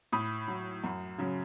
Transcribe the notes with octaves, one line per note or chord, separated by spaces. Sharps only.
A2 B5 D#6
F#3
F#2
C#3 F#3